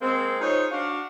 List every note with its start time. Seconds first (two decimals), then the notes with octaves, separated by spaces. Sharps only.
0.01 G#3 A#3 C4
0.40 D#4 F4 G#4 C5 C#5
0.71 D4 F#4 F5